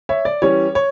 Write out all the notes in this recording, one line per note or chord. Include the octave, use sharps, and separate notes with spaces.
C#5 E5
D5
E3 G3 C#4 C#5
C#5